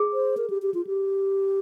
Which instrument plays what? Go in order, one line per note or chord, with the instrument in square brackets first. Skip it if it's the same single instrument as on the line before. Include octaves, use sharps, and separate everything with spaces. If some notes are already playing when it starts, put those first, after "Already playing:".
Already playing: [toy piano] G#4
[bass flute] C5
A#4
G4
G4
F4
G4